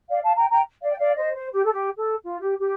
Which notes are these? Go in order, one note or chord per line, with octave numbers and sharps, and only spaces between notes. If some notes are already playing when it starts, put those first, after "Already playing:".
D5 F5
F5 A5
G5 A#5
G5 A#5
D5 F5
G5
D5 F5
C5 D#5
C5
G4
A4
G4
A4
F4
G4
G4